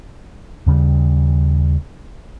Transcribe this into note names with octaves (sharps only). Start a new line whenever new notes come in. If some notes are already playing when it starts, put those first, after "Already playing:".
D#2 C#3 G3